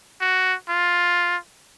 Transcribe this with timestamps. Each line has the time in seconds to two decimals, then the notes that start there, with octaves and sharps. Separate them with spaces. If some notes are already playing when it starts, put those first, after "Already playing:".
0.21 F#4
0.69 F4